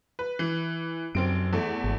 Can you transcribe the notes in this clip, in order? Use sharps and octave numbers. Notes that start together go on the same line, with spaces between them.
B4
E3
F1 F#2 C4 D7
E2 A3
G#1